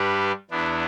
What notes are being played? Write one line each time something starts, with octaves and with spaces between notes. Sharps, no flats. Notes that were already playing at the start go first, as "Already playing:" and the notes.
Already playing: G2 G3 D4 G4 B4
E2 E3 B3 D4